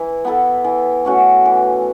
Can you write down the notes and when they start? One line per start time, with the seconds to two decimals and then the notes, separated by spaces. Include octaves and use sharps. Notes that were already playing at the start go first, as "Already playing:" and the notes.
Already playing: E3 E4
0.25 B3 E4 A4
0.64 E3
1.05 A3 C#4 F#4
1.45 E3